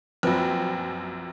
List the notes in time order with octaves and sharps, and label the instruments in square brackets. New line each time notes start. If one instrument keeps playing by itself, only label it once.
[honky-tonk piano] A#1 F#2 [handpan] F3 C4 B4